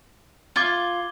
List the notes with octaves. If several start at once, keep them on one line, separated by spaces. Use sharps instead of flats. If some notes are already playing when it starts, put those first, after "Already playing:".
F4 D6 G#6 G7